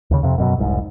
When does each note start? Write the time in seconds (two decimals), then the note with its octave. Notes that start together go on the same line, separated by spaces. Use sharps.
0.11 D#2 C#3
0.23 F2 C3
0.38 F#2 B2 F#3
0.58 F1 C2 G#2